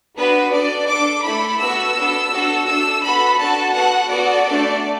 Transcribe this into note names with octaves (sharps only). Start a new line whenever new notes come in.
B3 D4 F#4 B4
D4 A4 D5
D4 A4 D6
A3 E4 A4 B5
B3 F#4 A4 E6
B3 D4 A4
D4 F#4 A4
A3 D4 A4 E6
B3 F#4 A4 B5
D4 F#4 A4 A5
B3 F#4 A4 F#5
B3 F#4 A4 D5
A3 D4 A4